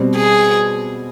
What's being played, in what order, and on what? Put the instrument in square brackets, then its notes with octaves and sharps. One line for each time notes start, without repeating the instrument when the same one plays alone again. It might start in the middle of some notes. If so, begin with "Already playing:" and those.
Already playing: [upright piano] B2 G3 C4
[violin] G#4